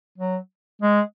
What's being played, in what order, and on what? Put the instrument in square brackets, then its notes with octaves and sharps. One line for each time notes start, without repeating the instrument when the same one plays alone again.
[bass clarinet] F#3
G#3